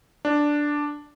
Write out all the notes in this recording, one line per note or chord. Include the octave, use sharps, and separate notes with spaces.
D4